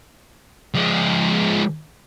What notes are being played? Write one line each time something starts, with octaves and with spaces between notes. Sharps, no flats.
F3 G#3